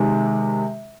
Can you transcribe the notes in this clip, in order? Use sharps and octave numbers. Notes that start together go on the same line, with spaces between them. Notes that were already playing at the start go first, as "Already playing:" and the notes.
Already playing: C3 D#3 G#3